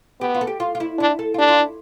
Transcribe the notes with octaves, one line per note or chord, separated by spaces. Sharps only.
B3 G4
F4
A4
G4
F4
F4
E4
D4 E4
A4
F4
D4 G4
F4
E4